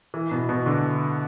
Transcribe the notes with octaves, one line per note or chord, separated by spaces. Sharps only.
E3
B2
B2
D3